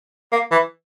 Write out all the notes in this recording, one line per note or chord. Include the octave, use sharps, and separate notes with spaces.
A#3
E3